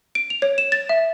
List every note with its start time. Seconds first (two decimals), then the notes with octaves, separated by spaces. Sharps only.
0.15 D7
0.30 F7
0.42 C#5
0.58 E7
0.72 A6
0.89 E5